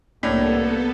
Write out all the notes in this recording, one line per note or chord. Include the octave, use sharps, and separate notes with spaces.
C2 A2 A#3 B3 D4 A4